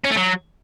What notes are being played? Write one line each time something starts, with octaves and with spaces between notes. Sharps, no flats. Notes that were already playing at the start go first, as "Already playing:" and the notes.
C#4
A3
F#3